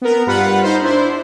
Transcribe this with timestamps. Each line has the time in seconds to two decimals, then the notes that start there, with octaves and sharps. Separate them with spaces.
0.02 B3 A#4
0.26 G2 G3 F4 B4 F#5
0.63 D#4 C5
0.82 D4 E4 C5